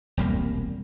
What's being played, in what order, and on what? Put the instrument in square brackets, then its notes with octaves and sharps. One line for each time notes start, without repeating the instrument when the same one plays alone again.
[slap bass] E1 C2 G3 A#3